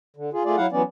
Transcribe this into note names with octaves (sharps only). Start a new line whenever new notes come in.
D3
F4 G#4
A3 F4 G#4 D5
F#3 E4 F5 F#5
E3 F#3 B3 C#4 D5